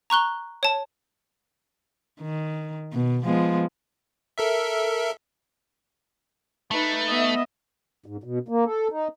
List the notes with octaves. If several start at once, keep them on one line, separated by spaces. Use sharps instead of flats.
A#5 C#6 F#6 G7
C#5 A5
D#3
B2
F3 G#3 B3
A4 A#4 E5
A3 D#4 B4
B3 D#5 E5
G#2
B2
A#3
A4
D#4